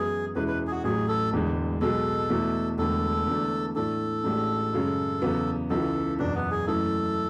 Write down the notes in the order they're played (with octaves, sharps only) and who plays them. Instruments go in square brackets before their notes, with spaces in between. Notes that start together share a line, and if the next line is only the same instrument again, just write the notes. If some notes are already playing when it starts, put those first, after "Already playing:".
Already playing: [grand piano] F#2 E3 G#3 B3 E4 [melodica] G#4
[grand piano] E2 B2 G#3 C#4 E4 [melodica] B4
[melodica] B4
G#4
F#4
[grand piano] A1 A2 F#3 [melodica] G#4
[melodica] A4
[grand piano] E1 E2 D3 G#3
[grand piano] B1 B2 G#3 [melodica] A4
[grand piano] E2 B2 A3 E4
[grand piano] E1 E2 D3 A3 [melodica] A4
[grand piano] E2 D3 A3 D4
[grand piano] A2 E3 A3 D4 [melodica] A4
[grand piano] A1 A2 G#3 D4
F#2 C#3 G#3 C#4
E2 C#3 F#3 B3
[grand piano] C#2 C#3 E3 [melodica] A4
[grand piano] F#1 E2 B2 F#3 [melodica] D4
[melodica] B3
G#4
[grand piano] F#1 F#2 E3 A3 E4 [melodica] A4